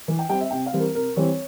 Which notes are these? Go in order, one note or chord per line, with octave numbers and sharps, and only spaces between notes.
E3
G5
G3 C4 G5
E5
C3 G5
F5
E3 G3 C4
A#4
C3 A#4
E3 G3 C4 C#5